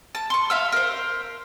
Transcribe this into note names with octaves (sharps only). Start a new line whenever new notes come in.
A5
C6 C#6
E5 F5 E6
A#4 C5